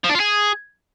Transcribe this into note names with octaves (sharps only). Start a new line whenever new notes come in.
F3
D4
F4
G#4